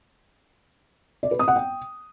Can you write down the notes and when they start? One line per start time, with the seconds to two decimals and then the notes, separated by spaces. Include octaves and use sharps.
1.23 D5
1.31 B4
1.39 D#6
1.48 F#5
1.56 G5